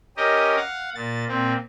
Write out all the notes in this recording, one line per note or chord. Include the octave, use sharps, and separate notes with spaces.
C#4 G4 A#4 D#5
F5 F#5
A#2 A6
A#2 C4